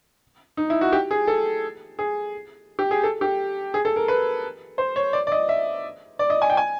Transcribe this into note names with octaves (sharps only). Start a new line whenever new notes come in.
D#4
E4
F#4
G4
G#4
A4
G#4
G4
G#4
A4
G4
G#4
A4
A#4
B4
C5
C#5
D5
D5
D#5
E5
D5
D#5
G#5
G5
G#5